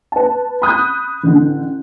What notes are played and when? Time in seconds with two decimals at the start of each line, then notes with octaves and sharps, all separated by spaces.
0.12 B4 A5
0.62 B5 D#6 F#6 G6
1.23 A1 D3